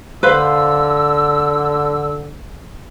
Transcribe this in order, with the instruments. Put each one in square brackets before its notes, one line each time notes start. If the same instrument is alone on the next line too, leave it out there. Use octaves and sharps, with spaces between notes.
[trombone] D3 [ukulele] B4 C5 F5 [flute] E6